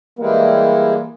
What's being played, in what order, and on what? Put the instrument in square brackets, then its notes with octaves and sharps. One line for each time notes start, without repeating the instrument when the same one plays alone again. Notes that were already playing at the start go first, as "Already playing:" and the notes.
[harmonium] E3 G3 G#3 [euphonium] A#3